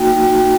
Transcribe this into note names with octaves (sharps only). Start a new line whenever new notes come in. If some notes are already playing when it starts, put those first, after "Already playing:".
Already playing: A#3 D#4 F#4 G5